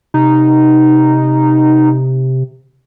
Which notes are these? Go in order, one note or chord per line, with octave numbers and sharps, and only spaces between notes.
C3 D#4